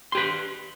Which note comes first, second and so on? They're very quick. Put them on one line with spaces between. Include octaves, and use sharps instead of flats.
C6 G4 B4